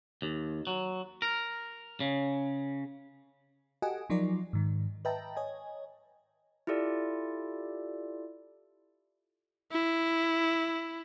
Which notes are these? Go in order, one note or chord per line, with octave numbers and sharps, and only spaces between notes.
D#2
F#3
A#4
C#3
F#4 G4 A4 D#5 F#5 G#5
F3 F#3 D#4 F4 A#4 D5
G#2 D#3
B4 D#5 E5 G5 A5 A#5
C#5 D#5 G#5
E4 F4 G4 A4 D5
E4